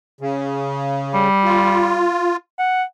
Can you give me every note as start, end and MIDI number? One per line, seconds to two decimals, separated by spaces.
0.21 1.29 49
1.14 2.08 55
1.44 2.37 65
2.59 2.83 78